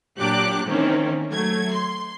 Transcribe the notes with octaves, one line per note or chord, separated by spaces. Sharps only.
A#2 F#3 D4 G4 D6 F#6
D#3 E3 A#3 C4 C#4
F#3 A3 G#6
C6